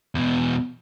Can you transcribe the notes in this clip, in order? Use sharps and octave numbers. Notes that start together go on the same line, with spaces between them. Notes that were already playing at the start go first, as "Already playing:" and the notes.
E2 B2